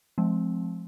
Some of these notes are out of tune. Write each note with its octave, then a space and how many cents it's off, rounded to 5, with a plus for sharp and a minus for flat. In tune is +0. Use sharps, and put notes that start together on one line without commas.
F3 +0 G#3 +35 C4 +0